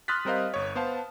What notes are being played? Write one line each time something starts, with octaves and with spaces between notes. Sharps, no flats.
C6 D#6 F6 F#6 A6 B6
G3 C4 A#4 C5 D#5 F5
G1 C#5
B3 C5 F5 A5